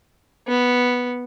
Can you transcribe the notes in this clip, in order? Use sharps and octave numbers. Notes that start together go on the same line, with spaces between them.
B3